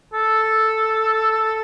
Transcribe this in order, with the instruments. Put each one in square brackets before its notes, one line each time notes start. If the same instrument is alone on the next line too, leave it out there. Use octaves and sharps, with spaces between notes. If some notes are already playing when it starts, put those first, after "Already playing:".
[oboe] A4